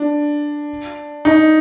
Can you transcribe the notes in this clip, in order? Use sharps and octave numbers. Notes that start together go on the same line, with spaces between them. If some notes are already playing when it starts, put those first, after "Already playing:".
Already playing: D4
D#4